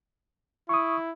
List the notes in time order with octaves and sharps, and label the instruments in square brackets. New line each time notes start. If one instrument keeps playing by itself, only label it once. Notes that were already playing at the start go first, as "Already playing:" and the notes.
[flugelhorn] E4 [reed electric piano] C#6 D#6